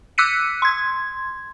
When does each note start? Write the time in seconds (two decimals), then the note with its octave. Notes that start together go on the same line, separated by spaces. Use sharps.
0.18 D6 E6 F#6 B6 C#7 D#7
0.62 C6 G#6